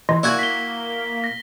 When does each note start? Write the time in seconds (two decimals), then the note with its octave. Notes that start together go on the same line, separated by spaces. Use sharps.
0.09 E3 D#5 C6 A#6
0.23 A#3 E4 F#4 D5 G#5 G#6
0.39 A#3 B6 G7
1.24 A#6